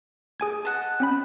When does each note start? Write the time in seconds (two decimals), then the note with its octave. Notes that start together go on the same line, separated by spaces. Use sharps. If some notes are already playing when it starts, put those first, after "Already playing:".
0.40 G#4 G#5 G#6
0.65 D#5 F#5 A5
1.00 C4 C#4 B5